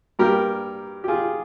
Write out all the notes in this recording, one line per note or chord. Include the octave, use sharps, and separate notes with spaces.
G2 G3 A#3 G4 A#4
G4
F4 G#4